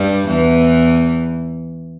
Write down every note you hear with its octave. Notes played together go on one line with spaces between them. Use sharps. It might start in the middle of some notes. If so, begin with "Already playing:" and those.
Already playing: G2 G3
E2 E3